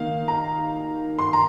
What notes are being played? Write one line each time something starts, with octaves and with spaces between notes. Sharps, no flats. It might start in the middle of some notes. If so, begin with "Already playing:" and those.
Already playing: D#3 A#3 D#4 F5
A#5
C6
A#5